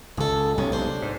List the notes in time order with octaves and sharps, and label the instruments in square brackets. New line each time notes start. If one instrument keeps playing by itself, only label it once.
[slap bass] C#2 [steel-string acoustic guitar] G#4 A4
[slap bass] B1 C3 G#3 [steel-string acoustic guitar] C#4
[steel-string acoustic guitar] D4 C5
[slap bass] G#2